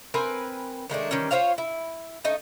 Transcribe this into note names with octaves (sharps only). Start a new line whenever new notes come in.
C4 A#4 B4 G#5
D#3 G#3 A3 D4
D#3 E3 G3 C#4
F4 C5 C#5 F5
E4
A3 D#4 D#5